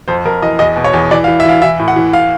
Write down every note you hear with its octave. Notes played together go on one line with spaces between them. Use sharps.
F2 C5
F2 A#4
E3 D#5
E2 D#5
B2
C#5
E2
E3 D5
F5
E3
E5
E3 F5
E3 E5
A2
F#5
E3
F5